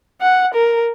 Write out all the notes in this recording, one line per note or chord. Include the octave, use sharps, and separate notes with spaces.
F#5
A#4